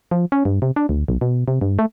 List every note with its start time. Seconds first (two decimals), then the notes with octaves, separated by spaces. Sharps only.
0.11 F3
0.32 C#4
0.45 G2
0.62 C3
0.76 D4
0.89 D2
1.08 B1
1.21 B2
1.48 C3
1.61 G2
1.79 A3